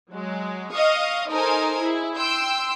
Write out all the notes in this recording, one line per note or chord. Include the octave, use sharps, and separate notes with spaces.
F#3 G#3
D#5 F5 C#6 D#6
D#4 A4 A#4 C5 D#5 G#5
E4 G#4
G5 C6 E6 G6